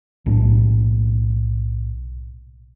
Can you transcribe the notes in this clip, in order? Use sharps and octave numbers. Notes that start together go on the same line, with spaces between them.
B1 A2 D4